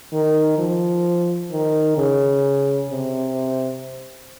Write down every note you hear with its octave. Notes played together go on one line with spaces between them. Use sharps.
D#3
F3
D#3
C#3
C3